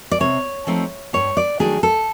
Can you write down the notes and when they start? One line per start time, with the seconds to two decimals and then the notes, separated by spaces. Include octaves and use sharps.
0.11 D5
0.20 C3 C#5
0.67 F3 A3 C4 D#4
1.13 G2 C#5
1.37 D5
1.59 D#3 F#3 A3 D4 G#4
1.83 A4